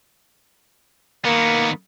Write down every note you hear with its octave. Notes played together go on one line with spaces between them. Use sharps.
D#3 A#3 B3